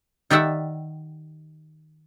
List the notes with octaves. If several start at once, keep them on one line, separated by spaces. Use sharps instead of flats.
D#3 G4 D5 E5 F#5